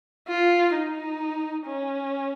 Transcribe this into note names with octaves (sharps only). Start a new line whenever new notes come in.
F4
D#4
C#4